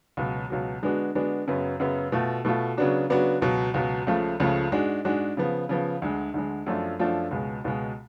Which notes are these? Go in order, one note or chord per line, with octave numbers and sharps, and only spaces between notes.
C#2 B2 F#3
C#2 B2 F#3
D3 G#3 B3 D4 F#4
D3 G#3 B3 D4 F#4
F#2 C#3 F#3 B3
F#2 C#3 F#3 B3
B2 A3 F4
B2 A3 F4
C#3 F#3 B3 D4 F#4
C#3 F#3 B3 D4 F#4
C#2 B2 F#3
C#2 B2 F#3
C#2 C#3 F3 A3 F4
C#2 C#3 F3 A3 F4
G#2 G#3 D4 F#4
G#2 G#3 D4 F#4
C#3 F3 B3
C#3 F3 B3
D2 D3 G#3
D2 D3 G#3
F#2 F3 A3 D4 F4
F#2 F3 A3 D4 F4
C#2 B2 G#3
C#2 B2 G#3